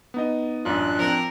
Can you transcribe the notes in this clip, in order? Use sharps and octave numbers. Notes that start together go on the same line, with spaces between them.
B3 D#4 D#5
A1 F#2 D4 F4 F#6
F3 C4 A#4